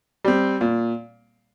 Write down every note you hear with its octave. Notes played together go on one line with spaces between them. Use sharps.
G3 C4
A#2